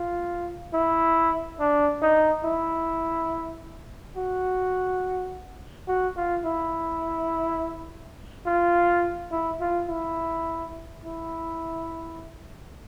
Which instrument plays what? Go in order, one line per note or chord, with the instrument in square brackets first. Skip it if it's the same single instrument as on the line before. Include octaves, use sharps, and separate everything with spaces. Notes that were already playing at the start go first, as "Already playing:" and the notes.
Already playing: [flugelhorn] F4
E4
D4
D#4
E4
F#4
F#4
F4
E4
F4
E4
F4
E4
E4